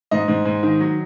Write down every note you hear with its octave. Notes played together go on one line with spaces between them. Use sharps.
G#2 D#5
G#2
G#2
D#3
F#3